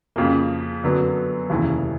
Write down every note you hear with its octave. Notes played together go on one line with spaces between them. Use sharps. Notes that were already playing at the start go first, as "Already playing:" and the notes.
F2 C#3 F3 A#3
F#2 D3 F#3 B3
F1 D#2 C#3 E3